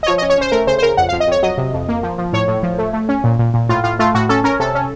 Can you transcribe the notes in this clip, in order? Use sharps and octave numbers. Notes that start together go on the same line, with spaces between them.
D#5
F3 C#5
D#5
C#4
C#5
C#4 C5
C5
A3 A#4
C#3 C5
C5
C#3 A#4
F2 F#5
F5
F2
D#5
F2 C#5
F#3 D#5
C3
F2
A#3
F3
F3
A2 C#5
A2
F3
A3
A3
C#4
A#2
A#2
A#2
A2 F4
A2 F4
A3 F4
A2 F#4
C#4 A4
C#4 A#4
C3 A4
C#4